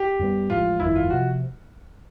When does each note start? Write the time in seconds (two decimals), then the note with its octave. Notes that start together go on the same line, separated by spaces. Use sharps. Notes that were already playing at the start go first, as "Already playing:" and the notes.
Already playing: G4
0.19 F#2 D#3 G3 B3
0.50 A1 A2 F3 G#3 F4
0.80 G1 F2 C3 D#3 E4
0.96 F4
1.10 C3 F3 F#4